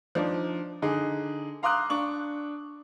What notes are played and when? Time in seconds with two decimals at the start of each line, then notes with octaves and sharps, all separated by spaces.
0.15 F3 D4 D#4 D5
0.82 D3 D#4 G#4
1.63 F5 A#5 C6 D6 D#6 F#6
1.90 D4 C#6 F#7